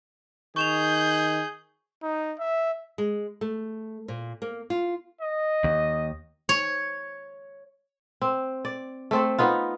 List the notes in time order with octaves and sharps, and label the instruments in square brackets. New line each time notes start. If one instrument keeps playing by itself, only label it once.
[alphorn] D#3 [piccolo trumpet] G#4 [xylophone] C#6 E7 F7 [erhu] G6
[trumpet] D#4
E5
[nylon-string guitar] G#3
A3
A#2
A#3
F4
[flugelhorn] D#5
[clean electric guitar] D#2
[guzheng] C#5
[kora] C4
D5
A3 C4 A4
B3 D#4 F4